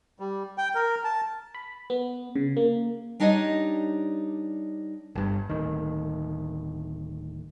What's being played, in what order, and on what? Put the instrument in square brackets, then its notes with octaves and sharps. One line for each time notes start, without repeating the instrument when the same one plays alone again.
[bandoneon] G3
G5
A#4
A5
[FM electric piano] B5
B3
C#3
A#3
[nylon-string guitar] G3 D4 D#4 G4 C#5 D#5
[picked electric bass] G1 G2
D1 D#3